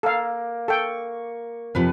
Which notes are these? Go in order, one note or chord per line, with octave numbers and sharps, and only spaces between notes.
A#3 A4 F5
A4 G5 C#6
F2 C3 F3 B4